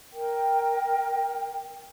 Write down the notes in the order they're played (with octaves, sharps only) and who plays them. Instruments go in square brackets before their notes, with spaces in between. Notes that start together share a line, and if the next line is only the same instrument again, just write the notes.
[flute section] A#4 G5